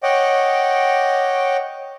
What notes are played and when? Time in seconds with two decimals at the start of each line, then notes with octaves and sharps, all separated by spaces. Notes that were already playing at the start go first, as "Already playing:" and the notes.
0.03 C#5 D#5 F#5 G5 D6